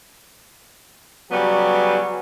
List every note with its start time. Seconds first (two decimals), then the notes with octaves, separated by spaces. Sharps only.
1.31 C#3 F#3 G3 B3 G4